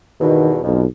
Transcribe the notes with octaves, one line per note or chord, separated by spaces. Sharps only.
E2 G2 B2 D#3
B1 F2